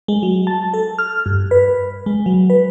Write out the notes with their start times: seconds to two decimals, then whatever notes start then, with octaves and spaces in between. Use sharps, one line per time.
0.08 G#3
0.23 F#3
0.47 A5
0.74 A4
0.99 F6
1.26 G2
1.51 B4
2.06 G#3
2.26 F#3
2.50 B4